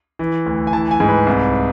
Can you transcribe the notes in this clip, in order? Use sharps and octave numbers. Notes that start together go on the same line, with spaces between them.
E3
D2
G#5
E3 A5
G#5
G#2
B4
C2